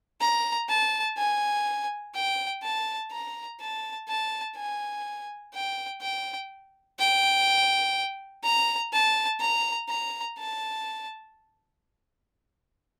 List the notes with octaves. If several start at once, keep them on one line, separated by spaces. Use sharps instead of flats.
A#5
A5
G#5
G5
A5
A#5
A5
A5
G#5
G5
G5
G5
A#5
A5
A#5
A#5
A5